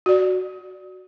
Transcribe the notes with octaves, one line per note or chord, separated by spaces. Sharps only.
F#4 D5